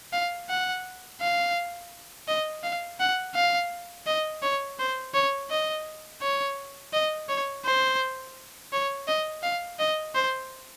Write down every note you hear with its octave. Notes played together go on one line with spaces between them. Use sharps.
F5
F#5
F5
D#5
F5
F#5
F5
D#5
C#5
C5
C#5
D#5
C#5
D#5
C#5
C5
C#5
D#5
F5
D#5
C5